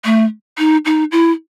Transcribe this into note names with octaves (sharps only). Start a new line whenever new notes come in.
A3
D#4
D#4
E4